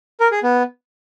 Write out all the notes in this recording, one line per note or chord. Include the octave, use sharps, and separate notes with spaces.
A#4
G#4
B3